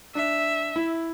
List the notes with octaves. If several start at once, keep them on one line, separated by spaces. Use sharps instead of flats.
D4 E5
E4